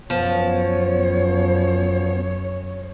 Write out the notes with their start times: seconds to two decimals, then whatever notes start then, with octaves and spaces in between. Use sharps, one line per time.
0.10 F#2 F3 B3 C#5